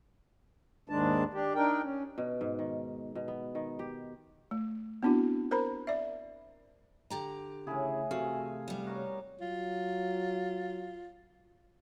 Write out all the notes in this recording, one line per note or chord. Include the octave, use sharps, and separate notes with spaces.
D#2 G#2 D#3 G#3 D4 A5
D4 G4
D4 D#4 A#4 G5
C#4
B2
G#2
D#3
B2
B3
D#3
G4
A3
B3 C4 D4 E4 F#4
A#4 C5 A#5 B5
D5 E5
D3 G4 A#5
A2 C#3 E3 E4 G#4
C3 A3 F#4 F5 G#5
G3 B3
F#4 A#4 C#5
F#3 F4